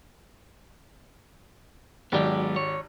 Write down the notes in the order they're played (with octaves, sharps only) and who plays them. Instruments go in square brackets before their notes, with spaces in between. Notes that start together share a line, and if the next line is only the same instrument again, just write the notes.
[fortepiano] G#1 G4 D5 [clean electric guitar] F#3 G#3 B3
[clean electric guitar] C#5